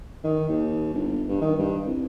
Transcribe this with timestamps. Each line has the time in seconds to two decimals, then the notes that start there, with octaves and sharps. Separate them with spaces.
0.24 D#3
0.49 D#2
0.94 G1
1.29 G2
1.41 D#3
1.59 G2
1.86 C2